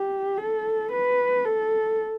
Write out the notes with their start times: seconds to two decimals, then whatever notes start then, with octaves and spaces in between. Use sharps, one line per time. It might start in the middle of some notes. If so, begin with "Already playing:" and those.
Already playing: G4
0.37 A4
0.92 B4
1.45 A4